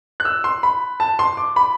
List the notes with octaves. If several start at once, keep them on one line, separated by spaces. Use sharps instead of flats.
F#6
E6
C6
B5
A5
C6
D6
B5